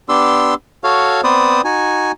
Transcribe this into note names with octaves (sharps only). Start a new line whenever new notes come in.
B3 D4 G4 C6 E6
F#4 A4 C#5 F5
B3 C4 B4 C5 D5 D#6
D#4 F#4 G#5